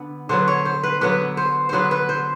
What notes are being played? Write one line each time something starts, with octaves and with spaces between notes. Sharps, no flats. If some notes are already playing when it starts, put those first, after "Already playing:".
Already playing: D3 B3
D3 F#3 B3 C5
C#5
C5
B4
D3 F#3 B3 B4
C5
D3 F#3 B3 B4 C5
B4
C5